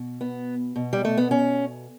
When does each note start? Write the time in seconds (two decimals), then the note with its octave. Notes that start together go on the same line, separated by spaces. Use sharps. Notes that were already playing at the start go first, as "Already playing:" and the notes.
Already playing: B2
0.21 B3
0.76 B2
0.93 G3
1.05 A3
1.17 B3
1.31 C#4